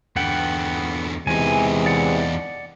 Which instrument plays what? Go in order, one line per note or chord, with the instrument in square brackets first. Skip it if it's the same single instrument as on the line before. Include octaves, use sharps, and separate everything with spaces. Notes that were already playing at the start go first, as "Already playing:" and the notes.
[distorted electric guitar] E2 D3 [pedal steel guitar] B3 F#5 G5
[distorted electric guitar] E2 D#4 [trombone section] C3 E3 G#3 [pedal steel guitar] G#5
[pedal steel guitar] D5 F#5